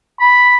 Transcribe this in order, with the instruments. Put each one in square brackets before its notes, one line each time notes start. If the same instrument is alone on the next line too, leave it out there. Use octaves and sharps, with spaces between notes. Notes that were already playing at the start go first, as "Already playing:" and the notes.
[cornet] B5